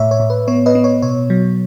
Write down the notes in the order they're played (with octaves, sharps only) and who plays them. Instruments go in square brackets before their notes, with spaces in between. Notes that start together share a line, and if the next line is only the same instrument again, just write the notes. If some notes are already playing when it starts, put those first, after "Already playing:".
Already playing: [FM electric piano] A2 C#5 E5
C#5
A2
B4
B3 C#5
B4 D#5
B3
C#5
B2 C#5
F#3